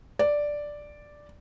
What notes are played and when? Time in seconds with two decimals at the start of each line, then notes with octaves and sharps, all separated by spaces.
0.19 D5